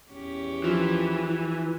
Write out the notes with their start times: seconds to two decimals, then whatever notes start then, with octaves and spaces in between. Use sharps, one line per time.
0.12 E2 C#4 G4
0.64 E3 F3